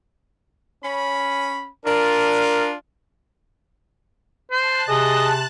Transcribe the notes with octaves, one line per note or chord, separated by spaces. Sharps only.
C#4 B5
D4 F4 A#4
C5 A5 F#6
C3 G#4 D#5